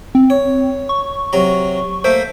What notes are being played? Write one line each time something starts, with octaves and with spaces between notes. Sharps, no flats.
C4
C#5
C#6
C3 F#3 A#5
A3 A#3 C5 E5